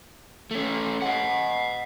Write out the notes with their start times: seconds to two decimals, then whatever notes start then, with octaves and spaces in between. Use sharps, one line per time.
0.51 A3 C#4
1.02 D#5 F#5